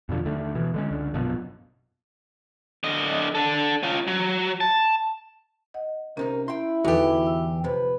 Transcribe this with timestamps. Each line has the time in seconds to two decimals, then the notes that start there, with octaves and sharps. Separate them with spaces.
0.09 F2 B2 D3 F3
0.25 D#2 D3 A3
0.55 B2 E3
0.74 D3 G#3 C#4
0.91 C#2 D3
1.14 A#1 F#2 B2 F3
2.84 D3 D#5
3.35 D4 A4
3.83 C#4 F4
4.07 F#3
4.61 A5
5.74 D#5 F#5
6.17 C2 C3 C#4 D#4 A#4
6.48 E4 G5 C6
6.84 E2 D3 D#4 F#4 G4 A4 B4
7.27 E6
7.64 F2 C3 B4